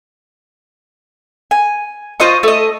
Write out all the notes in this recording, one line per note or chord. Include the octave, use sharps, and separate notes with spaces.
G#5
F4 C5 D#5 C#6
A3 D#5